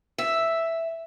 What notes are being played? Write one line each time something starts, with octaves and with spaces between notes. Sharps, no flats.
E5